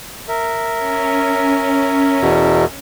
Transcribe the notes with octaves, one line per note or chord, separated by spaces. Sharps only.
A#4 E5
C#4
E2 B2